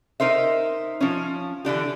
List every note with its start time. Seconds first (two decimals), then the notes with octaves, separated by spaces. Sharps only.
0.20 D#4 A#4 C5 E5
1.01 F3 C#4
1.65 D3 E3 D4 G4